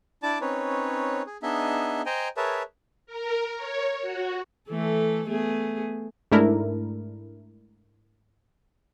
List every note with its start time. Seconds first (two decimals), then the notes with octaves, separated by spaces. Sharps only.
0.23 D4 E4 D5 A5 D6
0.41 C4 C#4 D#4 B4 C#5
1.26 G#4
1.43 B3 D4 D#4 G#4 D#5 E5
2.06 C5 D#5 G5 G#5 A#5
2.37 G#4 A#4 B4 C#5 E5 A5
3.06 A#4
3.56 C#5
4.02 F#4
4.69 E3 A3 A4
5.28 A3 B3 G#4
6.32 G#2 A3 D4 E4 A#4